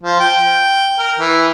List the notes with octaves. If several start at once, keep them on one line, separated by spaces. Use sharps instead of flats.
F3
G5
A#4
E3